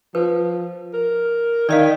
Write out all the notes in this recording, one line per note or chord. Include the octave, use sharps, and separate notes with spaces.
F3 B4
A#4
D#3 D5 D#5 F5